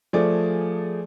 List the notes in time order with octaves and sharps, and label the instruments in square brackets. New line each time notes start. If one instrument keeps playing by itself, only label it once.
[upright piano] F3 A3 G#4 D5